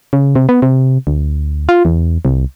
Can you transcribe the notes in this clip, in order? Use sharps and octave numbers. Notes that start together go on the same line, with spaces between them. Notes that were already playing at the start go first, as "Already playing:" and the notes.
C#3
C3
B3
C3
D2
F4
E2
C2